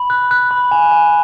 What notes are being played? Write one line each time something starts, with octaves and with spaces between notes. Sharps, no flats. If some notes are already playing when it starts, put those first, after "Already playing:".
Already playing: B5
F#6
F#6
B5
G#5
G#5